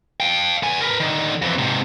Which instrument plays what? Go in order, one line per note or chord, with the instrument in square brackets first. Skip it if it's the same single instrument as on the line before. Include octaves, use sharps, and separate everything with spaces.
[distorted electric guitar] F5 G5
B3 G#5
A#4 B4
D3 D#3
F2 E3
G#2 C3